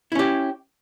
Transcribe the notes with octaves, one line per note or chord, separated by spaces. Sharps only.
C#4 E4 G4